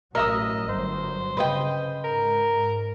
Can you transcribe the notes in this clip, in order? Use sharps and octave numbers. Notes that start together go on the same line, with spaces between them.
A1 F#3 A#4 D#5 E5 D#6
G1 F#3 C5
C#3 B4 D#5 G5
G#2 A#4